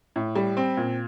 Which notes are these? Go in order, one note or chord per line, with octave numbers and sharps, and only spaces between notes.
A2
G3
C4
A#2